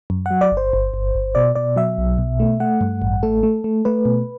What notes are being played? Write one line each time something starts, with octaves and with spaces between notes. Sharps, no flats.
F#2
F#3 F#5
D5
G1
C5
G1
G1
G1
B2 D5
B2 D5
F#3 E5
B1
B2
A3
A3 F#5
G2
A1
A3 A4
A3
A3
A3 B4
B2